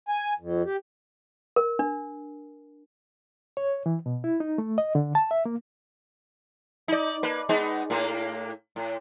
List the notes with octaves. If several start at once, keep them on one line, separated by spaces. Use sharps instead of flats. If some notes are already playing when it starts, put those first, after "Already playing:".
G#5
F2
G4
A#4
D4
C#5
E3
B2
E4
D#4
A3
D#5
D3
A5
E5
A#3
D#4 D5
A#3 B4
G#3 B3 D#4
A2 A#3
A2